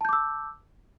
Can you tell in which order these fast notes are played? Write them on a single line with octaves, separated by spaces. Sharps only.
A5 G6 D6 E6